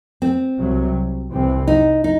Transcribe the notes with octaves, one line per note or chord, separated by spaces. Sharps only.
C4
C2 C3 F#3
C2 C3 E3 C4
D#4
D#4